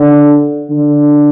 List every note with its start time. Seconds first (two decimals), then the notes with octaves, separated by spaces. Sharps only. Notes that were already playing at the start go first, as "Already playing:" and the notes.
Already playing: D3
0.70 D3